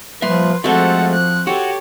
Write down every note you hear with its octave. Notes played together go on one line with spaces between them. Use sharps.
A#2 F3 G3 B4 E5 C6
F3 G#3 A3 C4 F#4 A4 F#5
F#6
F#4 G4 A4 C#5